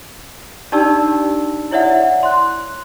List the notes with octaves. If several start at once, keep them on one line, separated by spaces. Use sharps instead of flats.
D4 D#4 G4 D5 A5 E6
E4 C#5 D5 E5 F#5
C6 F#6